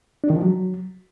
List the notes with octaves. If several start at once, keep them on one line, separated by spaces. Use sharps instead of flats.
D4
D#3
F3
F#3